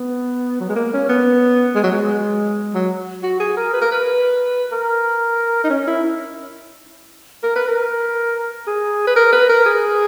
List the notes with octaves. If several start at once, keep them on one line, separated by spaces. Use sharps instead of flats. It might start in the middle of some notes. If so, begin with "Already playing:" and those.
Already playing: B3
F#3
G#3
A#3
C#4
B3
G#3
F#3
G#3
F#3
F#4
G#4
A#4
B4
A#4
B4
A#4
D#4
C#4
E4
A#4
B4
A#4
G#4
B4
A#4
B4
A#4
G#4